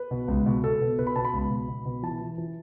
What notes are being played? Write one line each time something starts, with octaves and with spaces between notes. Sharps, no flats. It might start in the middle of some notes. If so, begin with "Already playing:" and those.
Already playing: B4
B2
C#2
B2
B2 A4
B2
B2 B4
B5
B2 A5
B5
C#2
B2
B2
B2
E3 A5
E3
E3